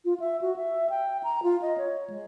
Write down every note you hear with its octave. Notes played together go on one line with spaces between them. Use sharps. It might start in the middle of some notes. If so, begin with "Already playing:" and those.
F4
E5
F#4
E5
G5
A#5
F4
D#5
C#5
G#3